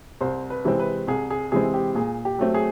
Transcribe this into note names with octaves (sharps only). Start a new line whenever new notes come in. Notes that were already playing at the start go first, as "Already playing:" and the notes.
C2 C5
B4
C3 E3 G#3 C4
B4
C2 G#4
G#4
C3 E3 G#3 C4 G#4
G4
A#2 G#4
G4
F#3 A3 C4
G#4